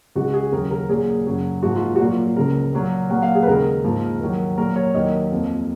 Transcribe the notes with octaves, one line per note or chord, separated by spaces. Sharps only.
C#2 C#3 G#3 F#4
G#4
D#2 C#3 F#3 A#4
A#4
A#2 F#3 A#3 G#4
F#2 C#3 F#3
G#2 F3 A#3 F#4
F4
F#4
A#2 F#3 A#3 F4
C#2 C#3 F3 A#4
A#2 F#3 A#3
A#2 F#3 A#3 F#5
F5
G#4
B4
D#2 C#3 G#3 A#4
G#2 F3 A#3
D#2 D#3 F#3
A#2 F#3 A#3 A#4
C#5
D#2 D#3 F#3 A#3 D#5
F2 F3 A#3